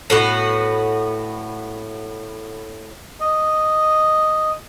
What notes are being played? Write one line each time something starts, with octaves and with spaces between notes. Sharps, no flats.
A2 B3 F#4
D#5